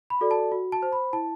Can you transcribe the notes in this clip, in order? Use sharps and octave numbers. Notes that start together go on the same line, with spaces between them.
B5
F#4 A4 D5
A5
F#4
A5
C5
B5
E4 A5